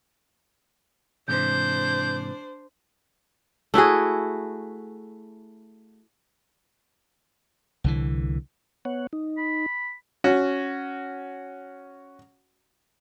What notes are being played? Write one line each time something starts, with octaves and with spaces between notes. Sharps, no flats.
G#2 C3 E3 D4 C5 G6
A3 E4 F#4 G#4
C2 D3 E3
B3 C#5 F#5
D#4
B5
C#4 F#4